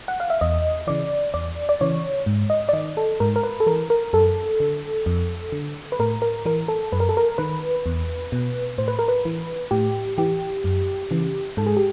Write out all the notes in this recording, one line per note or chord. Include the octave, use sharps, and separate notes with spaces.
F#5
F5
E5
E2 D#5
C#3 E3 D5
E2 D5
D5
C#3 E3 C#5
G#2
D#5
D5
D#3 D#5
A4
G#2 A#4
A#4
B4
A4
E3 A#4
A#4
F#2 A4
D3
F2
D3
B4
A2 A#4
A#4
E3 A#4
A4
F#2 B4
A#4
A4
A#4
D#3 B4
E2
B2
A2 C5
B4
A#4
B4
E3
A2 G4
E3 G4
F#2
C#3 E3
G#2 A4
G#4
G4